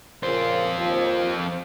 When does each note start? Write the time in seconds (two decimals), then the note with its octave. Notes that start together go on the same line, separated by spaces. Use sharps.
0.23 F2 A#2 C#3 C5
0.77 D#2 F3